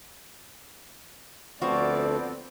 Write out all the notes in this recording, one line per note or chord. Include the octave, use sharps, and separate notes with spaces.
D2 F3 A3 B3 C4 F#4 D5